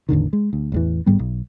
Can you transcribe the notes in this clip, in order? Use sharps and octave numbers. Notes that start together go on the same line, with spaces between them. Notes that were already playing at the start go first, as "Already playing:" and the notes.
A1 E2 D3 D#3
G#3
D2
A1 E2 E3
G#1 G#2 G3 B3
B1